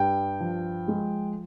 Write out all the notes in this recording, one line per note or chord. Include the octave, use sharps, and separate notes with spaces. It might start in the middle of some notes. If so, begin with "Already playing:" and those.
Already playing: G2 G5
F3
G#3